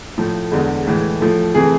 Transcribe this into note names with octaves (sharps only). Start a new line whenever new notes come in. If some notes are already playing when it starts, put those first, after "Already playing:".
A2 F3 A3
E2 D3 G#3
A2 E3 G#3
A2 F3 A3
C3 E3 A3 G#4